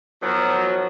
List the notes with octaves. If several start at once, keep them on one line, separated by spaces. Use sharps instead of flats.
B2 D#3 F3 F#3